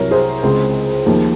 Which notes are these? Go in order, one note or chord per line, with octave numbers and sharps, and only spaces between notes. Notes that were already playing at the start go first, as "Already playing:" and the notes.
Already playing: C2 C3 F#3 A#4 C#5
G#4 C5
C#2 C#3 G#3 C4
D#2 C#3 F3 A#3